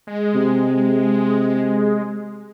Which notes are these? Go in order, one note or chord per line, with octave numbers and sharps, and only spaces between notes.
G#3
C3